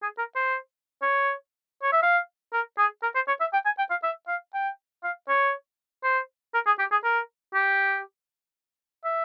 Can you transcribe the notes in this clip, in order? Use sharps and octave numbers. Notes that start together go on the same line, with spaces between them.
G#4
A#4
C5
C#5
C#5
E5
F5
A#4
G#4
A#4
C5
C#5
E5
G5
G#5
G5
F5
E5
F5
G5
F5
C#5
C5
A#4
G#4
G4
G#4
A#4
G4
E5